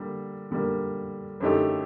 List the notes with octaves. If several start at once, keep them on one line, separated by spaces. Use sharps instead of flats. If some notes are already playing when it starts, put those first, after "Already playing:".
Already playing: D3 G3 A#3
D3 G3 A#3
F#2 D3 A3 D#4 G4